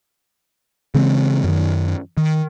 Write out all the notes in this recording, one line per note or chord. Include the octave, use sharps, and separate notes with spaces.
C#3 E3 G#3 C4
F#2 D#3
D#3